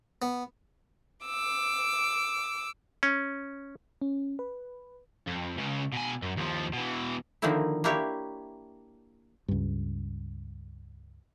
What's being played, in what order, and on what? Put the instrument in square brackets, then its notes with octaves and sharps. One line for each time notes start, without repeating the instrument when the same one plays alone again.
[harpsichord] B3
[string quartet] D6 E6
[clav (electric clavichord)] C#4
[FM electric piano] C#4
B4
[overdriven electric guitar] F2
C#2 C#3
B2 G#5
F#2
D#2 F3
B2 E3
[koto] D3 D#3 F3 A#3 C4 E4
A#3 D4 E4 G4 C#5
[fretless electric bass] C#2 G2